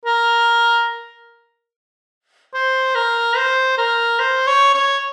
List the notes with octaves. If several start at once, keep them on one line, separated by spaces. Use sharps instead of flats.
A#4
C5
A#4
C5
A#4
C5
C#5
C#5